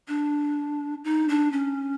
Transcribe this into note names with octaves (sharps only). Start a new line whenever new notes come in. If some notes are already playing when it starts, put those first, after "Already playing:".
D4
D#4
D4
C#4